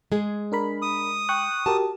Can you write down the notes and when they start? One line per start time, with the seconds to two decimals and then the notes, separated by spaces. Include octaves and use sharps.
0.12 G#3 G#4
0.52 D4 A#4 B5
0.82 D#6
1.29 G5 C#6 F#6
1.66 F#4 G4 A#4 A5